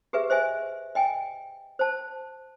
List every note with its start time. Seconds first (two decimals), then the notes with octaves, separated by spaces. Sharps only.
0.13 G4 G#4 B4 E5
0.30 C5 D#5 E5 G#5
0.95 D#5 G5 G#5
1.79 C5 A5